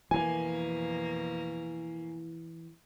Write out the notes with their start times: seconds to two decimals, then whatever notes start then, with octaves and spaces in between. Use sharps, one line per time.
0.11 F2 B2 E3 A#3 G#5